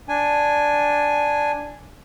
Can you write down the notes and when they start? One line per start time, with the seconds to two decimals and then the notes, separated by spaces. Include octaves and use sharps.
0.09 D4 G#5